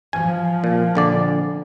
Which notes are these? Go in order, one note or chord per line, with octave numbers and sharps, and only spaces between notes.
F3 G#5
A#2
A#1 D3 D5